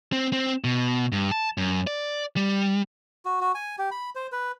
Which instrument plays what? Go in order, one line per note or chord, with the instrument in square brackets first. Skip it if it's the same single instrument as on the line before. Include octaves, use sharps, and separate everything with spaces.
[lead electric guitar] C4
C4
B2
G2
A5
F#2
D5
G3
[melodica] F#4
F#4
G#5
G4
B5
C5
B4